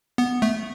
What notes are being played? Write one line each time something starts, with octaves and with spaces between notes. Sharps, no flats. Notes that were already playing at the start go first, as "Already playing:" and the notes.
B3
A3